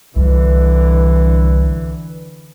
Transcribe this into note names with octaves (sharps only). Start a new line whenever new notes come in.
C2 D3 E3